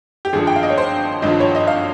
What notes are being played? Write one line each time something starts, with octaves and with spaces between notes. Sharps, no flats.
G4
G#1 G2 F3 G#4
G5
F5
D#5
C#5
C5
G#1 G2 F3 D#5
C#5
D#5
F5